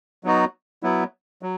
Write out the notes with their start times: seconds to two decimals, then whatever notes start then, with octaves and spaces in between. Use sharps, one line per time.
0.24 F#3 B3 D#4 F#4
0.83 F#3 B3 E4
1.42 F#3